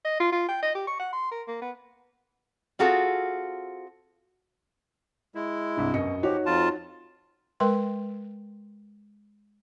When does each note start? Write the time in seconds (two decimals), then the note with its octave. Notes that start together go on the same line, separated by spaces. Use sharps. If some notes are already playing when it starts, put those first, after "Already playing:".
0.05 D#5
0.20 F4
0.32 F4
0.49 G5
0.63 D#5
0.75 G4
0.87 C#6
1.00 F#5
1.13 C6
1.31 A#4
1.48 A#3
1.62 B3
2.79 C4 F4 F#4 G#4 A4
5.35 G#3 E4
5.77 C2 G2
5.93 F#2 B2 D#5 C#7
6.23 F3 D#4 F#4 G4 C#5
6.46 F2 F4 A5
7.60 G#3 A#4 B4 G5 C6